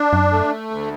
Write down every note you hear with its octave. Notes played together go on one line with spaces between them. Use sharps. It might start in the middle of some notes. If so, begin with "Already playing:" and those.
Already playing: D4
F#2
A3
D2